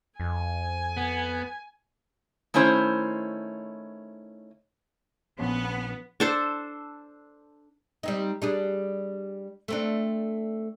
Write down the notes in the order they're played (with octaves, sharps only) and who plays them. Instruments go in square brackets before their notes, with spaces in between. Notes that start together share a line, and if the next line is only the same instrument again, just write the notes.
[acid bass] F2 [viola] G#5
[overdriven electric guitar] B3
[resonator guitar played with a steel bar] D#3 A3 C#4 E4 C5
[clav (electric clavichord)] A#1 C#4 C5 [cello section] B3
[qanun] D4 A4 C5
[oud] G3 C4 D#4
G3 D4 G#4
A3 C4 D4